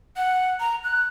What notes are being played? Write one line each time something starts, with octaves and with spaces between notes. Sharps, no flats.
F#5
A#5
F#6